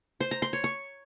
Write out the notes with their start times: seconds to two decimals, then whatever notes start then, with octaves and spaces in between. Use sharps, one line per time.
0.21 C5
0.31 A#5
0.42 C6
0.53 C#5
0.64 C#6